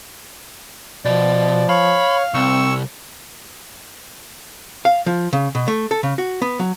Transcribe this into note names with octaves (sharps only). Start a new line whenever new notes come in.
B2 F3 D5
C#5 F5 B5
C2 C4 C#6 E6
F5
F3
C#3
B2
A3
A4
C#3
F#4
B3
F#3